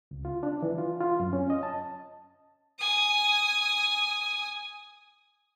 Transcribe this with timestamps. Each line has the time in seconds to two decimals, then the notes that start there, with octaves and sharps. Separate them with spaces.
0.11 C#2
0.25 F4
0.43 D4
0.62 E3
0.78 F4
1.01 F4
1.20 F#2
1.33 C#4
1.50 D#5
1.63 A5
2.79 G#5 D#6